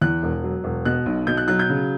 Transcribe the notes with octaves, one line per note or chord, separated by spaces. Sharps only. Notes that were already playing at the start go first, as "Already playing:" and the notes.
E2 F#6
E1
F#3
E1
B2 F#6
B1
B2 G6
F#6
F#3 F#6
G6
C#3